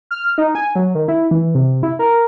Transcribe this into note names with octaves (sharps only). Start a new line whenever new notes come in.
F6
D#4
G#5
F#3
D#3
E4
E3
C3
E4
A#4